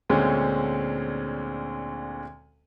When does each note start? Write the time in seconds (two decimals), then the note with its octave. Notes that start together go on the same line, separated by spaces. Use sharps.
0.10 D2 A#2 D3 G#3 C4 C#4